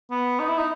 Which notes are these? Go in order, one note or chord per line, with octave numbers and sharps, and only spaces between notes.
B3
D#4
E4
D#4